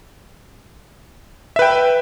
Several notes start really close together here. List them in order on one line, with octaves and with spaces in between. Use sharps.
E5 B4 G5